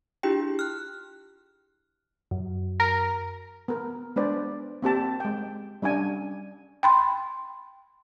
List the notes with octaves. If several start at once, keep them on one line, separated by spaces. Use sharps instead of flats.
D4 E4 F4 G4 G#4 G5
F6 F#6
F#2
A#4
B3 A#4
G#3 B3 D4 B4 C5 D5
A#3 C4 G4 A5
G#3 G5
G3 C#4 D4 G#5
G5 B5 C6